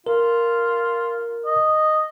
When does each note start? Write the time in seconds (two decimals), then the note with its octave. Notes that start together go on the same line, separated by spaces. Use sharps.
0.07 F4 A#4
1.46 D#5